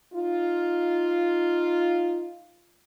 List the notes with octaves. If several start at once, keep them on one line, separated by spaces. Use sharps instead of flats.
D#4 F4